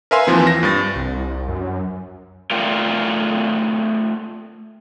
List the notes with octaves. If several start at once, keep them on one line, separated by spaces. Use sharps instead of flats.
A#4 B4 E5 F5 G#5 C6
D#2 E3 F3 C4
A#6
G2 A6
C2
F#2
A3 F4 A#4 D5 F5 G5